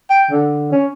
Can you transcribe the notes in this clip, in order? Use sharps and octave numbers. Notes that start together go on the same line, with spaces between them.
G5
D3
C#4